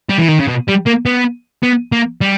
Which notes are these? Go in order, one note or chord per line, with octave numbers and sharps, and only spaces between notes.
G3
E3
D#3
C#3
B2
G3
A#3
B3
B3
A#3
G3